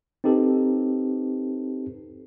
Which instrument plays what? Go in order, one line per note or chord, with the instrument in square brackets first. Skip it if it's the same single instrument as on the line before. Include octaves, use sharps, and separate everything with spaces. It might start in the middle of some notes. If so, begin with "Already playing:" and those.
[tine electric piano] C4 D#4 G4 A4 B4